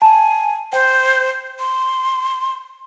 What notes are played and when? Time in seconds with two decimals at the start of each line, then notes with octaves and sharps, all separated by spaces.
0.02 G#5 A5
0.73 C5 G5
1.59 C6